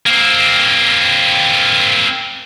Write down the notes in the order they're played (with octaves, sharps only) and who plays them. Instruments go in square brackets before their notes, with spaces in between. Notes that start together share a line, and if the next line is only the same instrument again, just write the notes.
[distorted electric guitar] A#3 C4